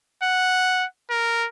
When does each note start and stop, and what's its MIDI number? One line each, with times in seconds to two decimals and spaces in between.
0.23 0.85 78
1.10 1.47 70